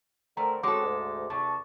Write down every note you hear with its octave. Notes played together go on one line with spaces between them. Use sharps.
D3 A3 C4 A#4 A#5
G#3 C4 C#4 F#4 A4 D6
D2 G#2
E2 C3 A5 C#6